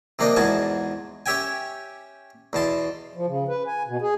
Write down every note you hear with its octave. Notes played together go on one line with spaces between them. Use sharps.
C3 F3 A#3 D4 D#4 D#5
E2 G#2 F3 F#4 G#5 A5
C#4 G4 C#5 E5 G5 G#5
E2 B2 A5 C6
F3
C#3
B4
G#5
B2
G#4